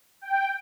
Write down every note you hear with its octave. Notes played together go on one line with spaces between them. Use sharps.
G5